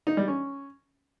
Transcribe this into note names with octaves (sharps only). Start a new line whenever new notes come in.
D#4
G3
C#4